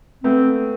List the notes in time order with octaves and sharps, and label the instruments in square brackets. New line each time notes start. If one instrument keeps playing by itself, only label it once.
[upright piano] A3 B3 [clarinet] C4